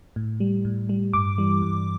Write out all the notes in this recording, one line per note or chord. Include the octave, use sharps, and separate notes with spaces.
A2
G3
A2
G3
G2 D6
E3 G3
G2